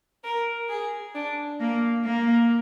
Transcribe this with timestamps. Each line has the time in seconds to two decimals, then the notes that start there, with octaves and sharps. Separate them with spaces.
0.24 A#4
0.69 G#4
1.14 D4
1.60 A#3
2.04 A#3